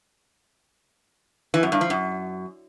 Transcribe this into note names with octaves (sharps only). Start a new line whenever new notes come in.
E3
F#2
G2
F3
F#2